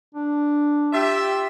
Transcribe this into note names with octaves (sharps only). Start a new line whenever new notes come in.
D4
F4 G4 E5